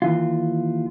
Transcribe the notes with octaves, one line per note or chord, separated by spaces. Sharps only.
D#2 E3 F4